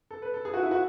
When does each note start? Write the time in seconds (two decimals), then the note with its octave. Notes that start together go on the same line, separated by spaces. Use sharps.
0.11 A4
0.22 B4
0.34 A4
0.45 G#4
0.54 F#4
0.63 E4
0.71 F#4